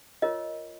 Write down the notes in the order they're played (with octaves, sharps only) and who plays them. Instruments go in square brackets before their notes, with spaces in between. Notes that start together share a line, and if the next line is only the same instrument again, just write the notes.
[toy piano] F4 A#4 C#5 D#5